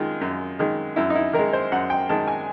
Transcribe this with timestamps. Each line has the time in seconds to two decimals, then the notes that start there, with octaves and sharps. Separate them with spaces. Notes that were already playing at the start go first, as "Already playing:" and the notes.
Already playing: F#2 D#3 G#3 F4
0.21 F#2
0.59 D#3 G#3
0.96 F#2 E4
1.10 D#4
1.15 E4
1.33 D#3 A#4
1.39 G#3
1.53 C5
1.72 F#2 F#5
1.90 G5
2.09 D#3 G#3 A5
2.28 G#5